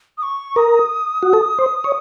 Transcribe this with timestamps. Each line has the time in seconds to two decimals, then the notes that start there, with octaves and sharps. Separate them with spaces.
0.18 D#6
0.23 C#6
0.56 A#4 D#6
1.23 F#4
1.33 A4
1.58 C5
1.84 C#5